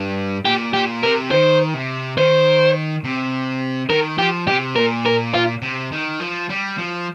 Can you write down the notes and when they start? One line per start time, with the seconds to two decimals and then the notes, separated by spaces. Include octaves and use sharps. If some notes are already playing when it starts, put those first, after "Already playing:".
Already playing: G2
0.45 A#2 G4
0.74 A#2 G4
1.03 C3 A#4
1.31 D#3 C5
1.74 C3
2.17 D#3 C5
3.04 C3
3.90 D#3 A#4
4.18 F3 G4
4.47 C3 G4
4.76 A#2 A#4
5.06 A#4
5.34 F4
5.62 C3
5.92 D#3
6.20 F3
6.49 G3
6.78 F3